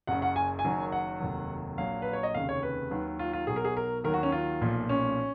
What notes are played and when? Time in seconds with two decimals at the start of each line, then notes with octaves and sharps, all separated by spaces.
0.07 F#1 F#2 C#3 F#5
0.22 F#5
0.36 G#5
0.59 G#5
0.64 F#1 F#2 D#3 F#3
0.92 F#5
1.20 F1 D#2 D#3 F#3
1.77 A#1 A#2 F#3 F5
2.02 B4
2.13 C#5
2.23 D#5
2.34 F1 D#2 C#3 F5
2.49 C#5
2.63 B4
2.91 D#2 D#3 F#3
3.19 F4
3.33 F4
3.47 B1 B2 F#3 G#4
3.56 A#4
3.65 G#4
3.77 A#4
4.04 D#2 D#3 F#3 A#4
4.14 F#4
4.23 C#4
4.32 F4
4.61 B1 A#2 F3
4.89 C#4